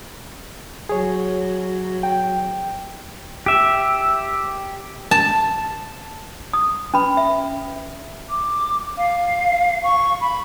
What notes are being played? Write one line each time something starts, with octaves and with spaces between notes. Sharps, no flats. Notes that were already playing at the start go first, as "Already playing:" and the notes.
F#3 G#4 C#5
G5
G4 E5
A5
D#6
C#4 B4 B5
E5
D6
F5
C#6
B5